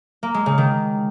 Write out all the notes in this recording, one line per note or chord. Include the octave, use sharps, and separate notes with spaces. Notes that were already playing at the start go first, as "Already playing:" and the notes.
A#3
G#3
C#3
D#3